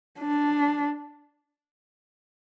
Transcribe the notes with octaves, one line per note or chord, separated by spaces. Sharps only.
D4